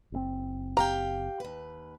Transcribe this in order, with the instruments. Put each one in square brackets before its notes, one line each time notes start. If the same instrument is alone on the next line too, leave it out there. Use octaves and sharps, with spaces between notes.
[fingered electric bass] F#1 A#2 C4
[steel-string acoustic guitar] G4 F5 G5 [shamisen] A#5
[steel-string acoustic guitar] D#2 B4